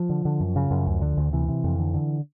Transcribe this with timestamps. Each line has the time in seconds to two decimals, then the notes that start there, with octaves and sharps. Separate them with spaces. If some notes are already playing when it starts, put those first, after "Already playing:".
Already playing: F3
0.09 D3
0.25 D3
0.40 F#2
0.56 C#3
0.71 F#2
0.87 D2
1.01 D3
1.17 D2
1.33 C3 E3
1.48 C3
1.64 F2
1.79 D3
1.94 D3